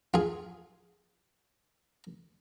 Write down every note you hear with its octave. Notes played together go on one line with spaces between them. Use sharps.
F4 G#4